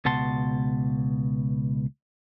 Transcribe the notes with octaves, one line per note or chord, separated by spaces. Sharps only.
C#2 B2 F#5 A5 C6